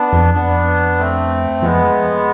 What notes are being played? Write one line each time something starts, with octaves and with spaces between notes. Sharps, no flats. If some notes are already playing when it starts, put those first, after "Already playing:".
Already playing: B3 D4
F2
B3 D4
A3 C4
F2 G#3 B3